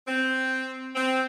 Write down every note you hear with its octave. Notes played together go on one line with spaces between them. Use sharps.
C4
C4